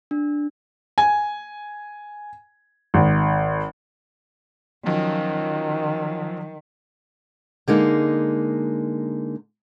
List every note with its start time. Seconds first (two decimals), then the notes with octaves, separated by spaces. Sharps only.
0.11 D4
0.98 G#5
2.94 G#1
4.86 D#3 F3 F#3 C#4
7.68 D3 G#3 A#3 D#4